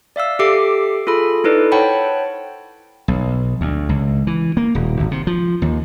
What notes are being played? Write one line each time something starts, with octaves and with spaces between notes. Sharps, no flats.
D5 E5 F5 E6
G4 A4 E5 D6 C7 D7
F4 G#4 A4 B5
D#4 E4 A4 B4 D5
C5 C#5 F#5 G5 A5 B5
B1
D2
C#2
E3
A#3
D#1
G#1
C3
F3
D#2